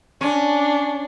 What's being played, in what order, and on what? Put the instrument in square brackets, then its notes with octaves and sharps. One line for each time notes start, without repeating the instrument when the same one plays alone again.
[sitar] C#4 [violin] D4